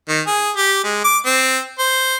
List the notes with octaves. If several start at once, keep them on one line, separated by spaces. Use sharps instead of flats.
D#3
G#4
G4
G#3
D6
C4
C5